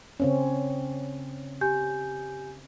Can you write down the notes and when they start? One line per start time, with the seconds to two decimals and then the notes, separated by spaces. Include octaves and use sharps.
0.20 C#3 C4 C#4
1.61 G4 G#5 G6